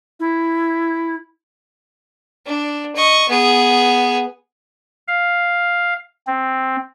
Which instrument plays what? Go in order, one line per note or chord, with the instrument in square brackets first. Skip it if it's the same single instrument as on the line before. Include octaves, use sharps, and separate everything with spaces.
[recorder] E4
[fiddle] D4
D#5 C#6
B3 G#4
[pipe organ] F5
C4